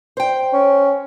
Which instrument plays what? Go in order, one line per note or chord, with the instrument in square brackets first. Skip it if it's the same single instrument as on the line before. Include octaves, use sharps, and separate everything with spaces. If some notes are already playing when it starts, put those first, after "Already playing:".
[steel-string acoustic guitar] C5 G5
[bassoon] C#4